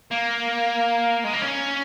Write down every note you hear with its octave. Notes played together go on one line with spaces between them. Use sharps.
A#3
G#3
A#3
C#4